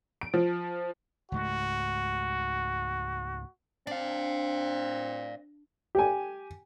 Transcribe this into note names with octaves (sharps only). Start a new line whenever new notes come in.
D7
F3
C#2 G#2 A3 F#4
C4 D4 D5 F5
G4 G#5